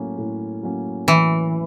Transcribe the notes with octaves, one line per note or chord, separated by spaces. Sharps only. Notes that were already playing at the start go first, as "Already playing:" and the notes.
Already playing: A2 F#3 A#3 C#4
A2
F#3 A#3 C#4
A2 E3